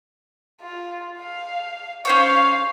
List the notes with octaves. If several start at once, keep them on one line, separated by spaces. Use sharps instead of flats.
F4
F5
C#4 C5 C#5 F5